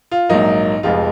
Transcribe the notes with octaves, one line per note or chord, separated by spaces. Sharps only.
F4
A#1 G#2 F#3 A#3 D#4
F1 F2 F3 G#3 F4